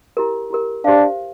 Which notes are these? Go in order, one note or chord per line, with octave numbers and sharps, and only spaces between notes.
E4 G4 A#4
E4 G4 A#4
D4 G4 C5 F5